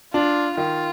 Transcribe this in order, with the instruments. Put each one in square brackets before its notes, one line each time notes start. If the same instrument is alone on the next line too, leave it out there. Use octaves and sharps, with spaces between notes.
[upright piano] D4 [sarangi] F4
[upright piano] D#3 [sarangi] F4